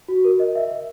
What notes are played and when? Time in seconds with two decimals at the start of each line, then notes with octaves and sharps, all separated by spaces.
0.08 F#4
0.25 A#4
0.40 D#5
0.55 E5
0.71 E5